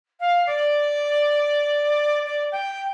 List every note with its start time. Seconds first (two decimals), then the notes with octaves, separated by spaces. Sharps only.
0.19 F5
0.46 D5
2.25 D5
2.51 G5